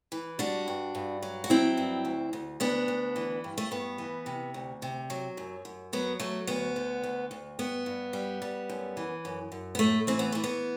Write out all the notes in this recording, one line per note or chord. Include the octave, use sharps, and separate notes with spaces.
E3
G3 D4 F#4
G2
G2
F#3
F#4
F#3 C4 E4
G2
D2
D2
D2 B3 D4
D2
E3
G2
A3
G2 B3
E3
C3
D2
C3
F#3
F#2
F#2
F#3 B3
F#3 A3
D2 B3
D3
D2
D2
G2 B3
G2
G3
G3
F#2
E3
F#2
F#2
B3
A2 A3
E3 C4
B3
E3 A3
B3